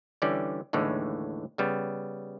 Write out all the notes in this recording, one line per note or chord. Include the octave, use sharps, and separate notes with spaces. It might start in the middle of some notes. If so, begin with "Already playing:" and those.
D3 E3 G3 C#4 D5
D#2 A2 D3 E3 G#3
C#3 G3 B3